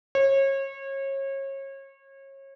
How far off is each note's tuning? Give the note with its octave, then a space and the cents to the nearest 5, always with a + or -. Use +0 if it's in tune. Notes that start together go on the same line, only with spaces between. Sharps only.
C#5 -30